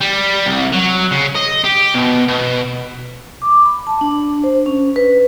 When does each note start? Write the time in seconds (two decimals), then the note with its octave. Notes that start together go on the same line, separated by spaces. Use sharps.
0.01 G3
0.46 C2
0.73 F#3
1.11 C#3
1.36 D#5
1.64 G4
1.94 B2
2.28 B2
3.42 D6
3.66 B5
3.87 A5
4.01 D4
4.44 C5
4.66 C#4
4.96 B4